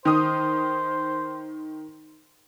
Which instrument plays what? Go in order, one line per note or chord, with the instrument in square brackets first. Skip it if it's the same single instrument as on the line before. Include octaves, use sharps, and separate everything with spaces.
[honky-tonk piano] D#3 D#6 [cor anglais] C5